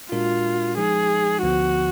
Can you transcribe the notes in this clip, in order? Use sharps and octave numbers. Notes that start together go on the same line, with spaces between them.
A#2 G#3 D4 F4 F#4 A#4
F3 G#3 D#4 G#4
D2 D3 F3 B3 F#4